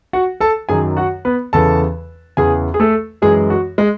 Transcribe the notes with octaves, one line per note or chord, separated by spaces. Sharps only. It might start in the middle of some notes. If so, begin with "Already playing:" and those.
F#4 F#5
A4 A5
F#2 D#3 F#3 G#4 G#5
F#4 F#5
B3 B4
E2 C#3 E3 A4 A5
E2 C#3 E3 G#4 G#5
G#4
A3 A4
F#2 E3 G#3 G#4
F#4
G#3 G#4